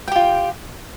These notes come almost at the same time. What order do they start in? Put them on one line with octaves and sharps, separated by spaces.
G5 G4 F4